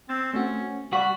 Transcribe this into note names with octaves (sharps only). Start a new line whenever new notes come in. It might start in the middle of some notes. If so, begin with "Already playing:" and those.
C4 E6 A6
A3 C4 C#4 F#4
G3 F#4 B6